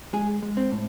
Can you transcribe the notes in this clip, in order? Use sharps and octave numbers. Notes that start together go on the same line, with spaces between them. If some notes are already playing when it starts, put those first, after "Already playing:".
G#3 G#4
G#3
C4
A2